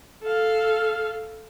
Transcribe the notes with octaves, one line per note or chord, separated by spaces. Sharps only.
A4 F5